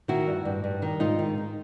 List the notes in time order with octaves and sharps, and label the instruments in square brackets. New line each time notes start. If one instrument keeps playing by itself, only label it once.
[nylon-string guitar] D#3 E4 F#4
G2
G2
G2
D#3
G#2 D#4 F4
D#3
D#3